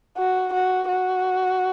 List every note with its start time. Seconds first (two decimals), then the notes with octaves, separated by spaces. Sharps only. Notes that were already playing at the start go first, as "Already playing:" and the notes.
0.18 F#4
0.53 F#4
0.89 F#4